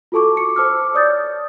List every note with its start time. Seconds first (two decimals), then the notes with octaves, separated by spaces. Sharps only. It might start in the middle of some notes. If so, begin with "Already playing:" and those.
0.12 F4 F#4 A4 A5 C#6 D6
0.37 C#7
0.56 C5 A5 D6 E6 F6
0.94 C#5 D5 D#6 G6 A6